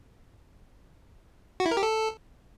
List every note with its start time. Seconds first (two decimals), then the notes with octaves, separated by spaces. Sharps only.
1.60 F#4
1.66 E4
1.71 A#4
1.77 G4
1.83 A4